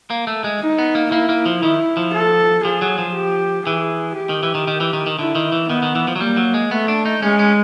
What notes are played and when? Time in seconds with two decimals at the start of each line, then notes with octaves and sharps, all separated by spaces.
0.10 A#3
0.27 A3
0.44 G#3
0.61 D#4
0.79 B3
0.95 A#3
1.12 A#3 E4
1.29 A#3
1.46 F3
1.63 D#3 E4
1.97 F3
2.14 A4
2.64 F3 G#4
2.82 F#3
2.98 F3
3.15 G4
3.66 E3 G#4
4.17 G4
4.29 D#3
4.43 E3
4.55 D#3
4.68 D#3
4.80 E3
4.93 D#3
5.07 D#3
5.18 D3 E4
5.35 D#3
5.52 E3
5.70 D#3 B3
5.83 D#3
5.95 E3
6.08 F3
6.16 F#3
6.20 G3 A#3
6.37 F#3
6.54 G#3
6.71 A3 B3
6.88 D4
7.05 D#4
7.22 G#3 C#4
7.39 C#4